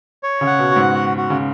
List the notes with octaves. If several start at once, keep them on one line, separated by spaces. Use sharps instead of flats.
C#5
C#3
F#5
B2
F#4
G#2
F#4
F#4
C#3